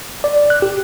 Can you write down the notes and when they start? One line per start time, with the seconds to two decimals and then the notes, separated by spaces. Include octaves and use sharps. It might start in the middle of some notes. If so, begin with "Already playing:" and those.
0.24 D5
0.50 F#6
0.62 G4